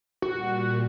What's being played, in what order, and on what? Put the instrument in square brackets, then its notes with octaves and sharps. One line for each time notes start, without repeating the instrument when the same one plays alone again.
[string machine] A#2 G3 [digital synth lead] F#4